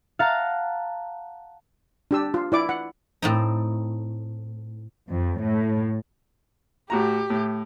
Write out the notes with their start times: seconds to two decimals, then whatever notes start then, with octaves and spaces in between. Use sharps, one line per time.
0.19 F5 F#5 A5 A#5
2.11 D4 G4 E6
2.34 F4
2.52 E4 D5 D6
2.69 F#5
3.22 A2 C4 D#4
5.08 F2
5.39 A2
6.90 A2 F#4 G4 A#5
7.30 A2